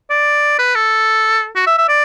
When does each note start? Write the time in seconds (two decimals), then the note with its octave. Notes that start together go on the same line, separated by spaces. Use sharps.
0.10 D5
0.59 B4
0.75 A4
1.56 F#4
1.67 E5
1.78 E5
1.89 D5